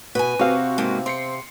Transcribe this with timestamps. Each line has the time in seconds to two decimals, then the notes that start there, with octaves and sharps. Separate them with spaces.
0.15 B2 B4 G#5
0.39 C3 C4 F#4 F5
0.78 G#2 B2 A#3
1.06 C4 C6 C7 C#7